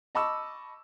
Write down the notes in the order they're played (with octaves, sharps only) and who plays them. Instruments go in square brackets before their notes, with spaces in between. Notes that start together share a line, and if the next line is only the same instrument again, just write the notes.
[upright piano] D#5 A5 B5 C#6 D6 E6